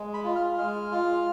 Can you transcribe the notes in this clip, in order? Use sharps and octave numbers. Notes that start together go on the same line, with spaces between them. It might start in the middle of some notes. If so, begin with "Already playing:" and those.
Already playing: G#3
B5
F4
F6
G#3 F6
F4